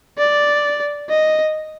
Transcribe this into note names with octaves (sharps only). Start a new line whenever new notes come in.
D5
D#5